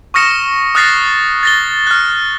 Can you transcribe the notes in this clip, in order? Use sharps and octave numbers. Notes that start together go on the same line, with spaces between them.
C#6 D#6 F6 A#6 C#7 E7
D#6 F6 F#6 A6 A#6 C7
A6 A#6 G7
F6 F#6